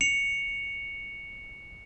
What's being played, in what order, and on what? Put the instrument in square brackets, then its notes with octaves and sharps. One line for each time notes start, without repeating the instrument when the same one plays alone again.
[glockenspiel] C#7 F7